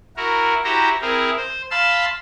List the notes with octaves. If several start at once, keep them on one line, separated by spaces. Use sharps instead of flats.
E4 F#4 A#4
E4 F#4 G4 C5 A#5
C4 E4 G#4 A#4
C5
F5 A5 B5 C6 E6